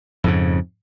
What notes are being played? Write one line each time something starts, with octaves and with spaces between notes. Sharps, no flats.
F2 G#2 C#3